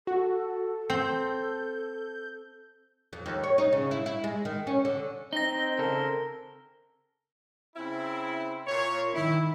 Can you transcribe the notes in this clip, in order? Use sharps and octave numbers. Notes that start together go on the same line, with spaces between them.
F#4 A4
C4 G6
F2
D#2
C#5
D#4
C#3
E4
E4
G#3
D#3
C#4
D3
C4 D#4 A#6 G7
C#3 A4 A#4
C#3 C4 E4
A#2 C#5
D#3 E4